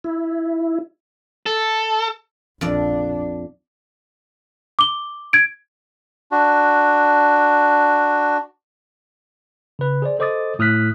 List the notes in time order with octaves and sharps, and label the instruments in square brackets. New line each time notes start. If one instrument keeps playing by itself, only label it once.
[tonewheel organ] E4
[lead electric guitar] A4
[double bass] A#1 D4 [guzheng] F2 D5
[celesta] D6 G7
G#6 D7
[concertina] D4 F#4
[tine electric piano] C#3 B4
G#4 C5 D5
A4 C5 D#5 D6 D#6 A6
A2 D#6 F6 F#6 B6